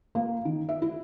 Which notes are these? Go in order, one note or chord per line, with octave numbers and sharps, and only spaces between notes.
A#3
D#3
E5
E4